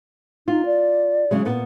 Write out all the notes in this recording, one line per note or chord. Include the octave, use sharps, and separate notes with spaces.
D#4 F4
D5
C#3 F#3 G#3
A#2 B3